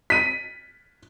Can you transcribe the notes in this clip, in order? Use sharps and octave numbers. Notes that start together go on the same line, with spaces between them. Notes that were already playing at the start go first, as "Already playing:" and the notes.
B6 D#7